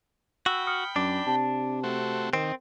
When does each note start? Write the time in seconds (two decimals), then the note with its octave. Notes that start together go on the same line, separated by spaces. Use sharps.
0.46 F#4 G5 B5 E6
0.67 D#6 F6 C#7
0.96 F#2 D4 D6
1.27 C3 A5
1.84 A3 C4 F#4
2.33 D#3 C4 A#4